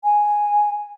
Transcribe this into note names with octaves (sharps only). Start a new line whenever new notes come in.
G#5